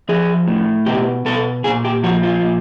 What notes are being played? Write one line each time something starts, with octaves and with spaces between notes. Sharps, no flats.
F3 G#4
A2
B2 G4
B2 A4
A#2 G#4
G4
F3 F#4
F4
A#2